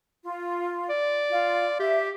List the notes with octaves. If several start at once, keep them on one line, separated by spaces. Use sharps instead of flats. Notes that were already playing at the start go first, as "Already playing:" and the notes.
F4
D5
F4
G4 E5